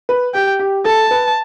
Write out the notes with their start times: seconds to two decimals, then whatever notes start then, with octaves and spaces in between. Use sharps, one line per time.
0.09 B4
0.34 G4 G5
0.59 G4
0.85 A4 A5
1.11 B4